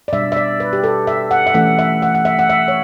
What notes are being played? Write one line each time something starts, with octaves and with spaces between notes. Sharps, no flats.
D5
B2 G3 D4 E5
E5
D5
B4
G4
A4
E5
F#5
E5
E3 A3 C#4 E4 F#5
E5
F#5
F#5
E5
F#5
E5
C#5